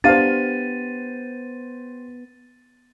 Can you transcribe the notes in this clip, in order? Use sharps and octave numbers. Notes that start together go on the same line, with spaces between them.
B3 D4 G4 C5 F5 A6 D#7